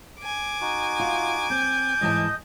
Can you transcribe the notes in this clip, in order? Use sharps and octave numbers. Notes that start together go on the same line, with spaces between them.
G#5 D6
D#4 F#4
F4
C4 G6
G#2 E3 D#5 A5